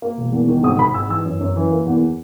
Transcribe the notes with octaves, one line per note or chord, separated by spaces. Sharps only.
A#3
E1
E2
D#3
G#1 D#6
G#1 B5
G#2 E6
E3 E6
F#2
F#2
E3
A#3
E2